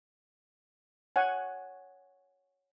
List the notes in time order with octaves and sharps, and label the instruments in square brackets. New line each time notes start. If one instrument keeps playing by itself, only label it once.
[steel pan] C#5 F#5 G#5